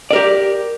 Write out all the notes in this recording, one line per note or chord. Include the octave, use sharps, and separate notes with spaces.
G4 A#4 D5